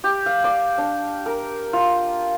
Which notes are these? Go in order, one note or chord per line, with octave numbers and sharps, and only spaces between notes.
G4
F5
D5
D4
A#4
F4